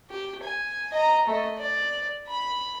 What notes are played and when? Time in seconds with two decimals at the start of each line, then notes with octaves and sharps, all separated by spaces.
0.10 G4
0.44 G#5
0.92 D#5 A#5
1.27 A3 D#5
1.58 D5
2.28 B5